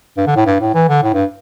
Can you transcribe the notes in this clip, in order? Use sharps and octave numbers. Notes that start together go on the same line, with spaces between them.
G2
D3
A2
G2
A2
E3
D3
A2
G2